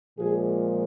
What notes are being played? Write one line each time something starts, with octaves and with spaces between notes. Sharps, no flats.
A#2 F3 G#3 G#4